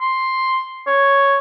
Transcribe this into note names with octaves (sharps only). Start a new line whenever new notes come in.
C6
C#5